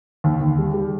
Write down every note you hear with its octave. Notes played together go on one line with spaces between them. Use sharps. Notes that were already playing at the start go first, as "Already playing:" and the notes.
D#2
D#2
G3
G3